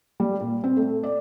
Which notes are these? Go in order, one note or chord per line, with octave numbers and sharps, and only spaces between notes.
G3
A#2
C4
A3
D5